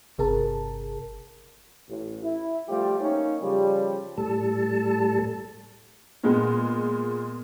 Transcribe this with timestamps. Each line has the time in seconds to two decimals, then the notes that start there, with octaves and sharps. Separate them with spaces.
0.18 G1 C3 G#4 A#4 A5
1.88 A1
2.23 E4
2.68 F3 G3 A3 F4 G4
3.00 A#3 C#4 D#4
3.42 C#3 F3 G3
4.17 A2 G3 A4 A5
6.24 A#2 G#3 B3